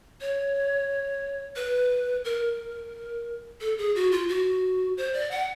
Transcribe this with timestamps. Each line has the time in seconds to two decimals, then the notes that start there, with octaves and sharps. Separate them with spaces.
0.21 C#5
1.56 B4
2.25 A#4
3.61 A4
3.78 G#4
3.95 F#4
4.12 F4
4.28 F#4
4.97 C5
5.14 D5
5.31 F#5